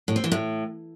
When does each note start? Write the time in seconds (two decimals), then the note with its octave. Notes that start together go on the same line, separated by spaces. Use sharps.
0.08 A2
0.16 C4
0.24 E3
0.32 A2